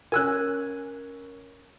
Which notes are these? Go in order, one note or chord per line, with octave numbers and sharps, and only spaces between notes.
C#4 A#4 G#5 E6 F#6